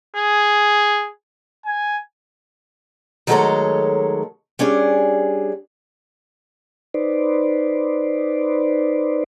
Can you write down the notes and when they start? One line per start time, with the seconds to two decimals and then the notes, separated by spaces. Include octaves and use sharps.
0.16 G#4
1.65 G#5
3.27 D#3 F#3 G#3 A3 A4 C#5
4.59 G3 C#4 D4 G#4
6.94 D#4 B4 C5 D5